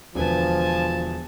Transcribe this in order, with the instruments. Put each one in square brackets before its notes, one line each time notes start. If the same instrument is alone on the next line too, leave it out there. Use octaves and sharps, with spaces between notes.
[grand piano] E1 D3 B4 [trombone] F3 [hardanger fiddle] G#5 A5